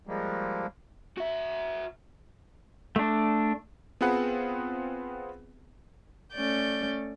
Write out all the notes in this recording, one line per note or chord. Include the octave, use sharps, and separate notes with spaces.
F3 G3 G#3 A#3
F#4 E5
A3 D4
B3 C4 F4 G#4 B4 F#5
A3 C#4 D5 G6